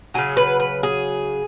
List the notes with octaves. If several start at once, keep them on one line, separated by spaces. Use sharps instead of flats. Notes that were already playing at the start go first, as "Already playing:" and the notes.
C#3 F#3 G#4
B4
B4
G#4